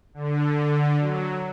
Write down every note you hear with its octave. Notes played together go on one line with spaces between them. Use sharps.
D3
F#3